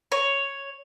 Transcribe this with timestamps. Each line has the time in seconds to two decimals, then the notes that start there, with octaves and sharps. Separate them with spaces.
0.12 C#5